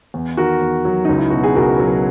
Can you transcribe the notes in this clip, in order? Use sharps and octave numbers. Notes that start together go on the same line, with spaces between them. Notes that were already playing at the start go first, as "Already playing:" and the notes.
E2
D#3 F#4 A#4
E2
F#3
C#2 D#4
E4
B2 F#4
G#4
C#2 F#4 A#4
F#3